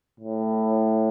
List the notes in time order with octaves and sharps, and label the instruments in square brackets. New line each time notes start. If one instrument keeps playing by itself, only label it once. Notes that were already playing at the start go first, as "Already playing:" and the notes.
[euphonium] A2